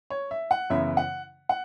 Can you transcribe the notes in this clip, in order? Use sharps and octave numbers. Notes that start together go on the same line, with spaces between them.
C#5
E5
F#5
F#2 C#3 E3 B3 E5
F#5
F#5